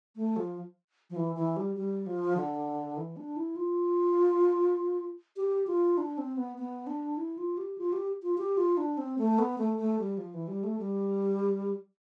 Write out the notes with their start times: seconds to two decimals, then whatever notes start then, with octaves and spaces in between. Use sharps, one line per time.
0.16 A3
0.36 F3
1.10 F3
1.16 E3
1.36 E3
1.57 G3
1.76 G3
2.06 F3
2.37 D3
2.97 E3
3.17 D4
3.37 E4
3.56 F4
5.37 G4
5.67 F4
5.98 D4
6.18 C4
6.37 B3
6.58 B3
6.87 D4
7.17 E4
7.38 F4
7.58 G4
7.78 F4
7.93 G4
8.23 F4
8.38 G4
8.57 F4
8.77 D4
8.98 C4
9.18 A3
9.39 B3
9.58 A3
9.78 A3
9.99 G3
10.18 F3
10.34 E3
10.48 G3
10.64 A3
10.79 G3